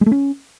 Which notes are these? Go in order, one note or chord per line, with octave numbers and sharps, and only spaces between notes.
G#3
A3
C#4